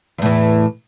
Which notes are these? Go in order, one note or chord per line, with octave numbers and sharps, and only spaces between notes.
E2 A2 E3